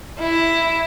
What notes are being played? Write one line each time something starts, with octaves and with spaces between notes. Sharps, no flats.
E4